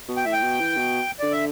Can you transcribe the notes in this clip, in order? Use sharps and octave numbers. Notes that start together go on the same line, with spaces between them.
B2
G5
A2 E5
G5
B2
E3
B2
D3 D5
E5